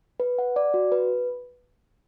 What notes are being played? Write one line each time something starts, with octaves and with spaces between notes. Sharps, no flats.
B4
F#5
D5
F#4
B4